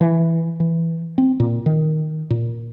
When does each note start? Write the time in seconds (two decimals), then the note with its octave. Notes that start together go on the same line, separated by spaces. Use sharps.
0.01 E3
0.60 E3
1.18 C4
1.40 A#2
1.66 D#3
2.30 A#2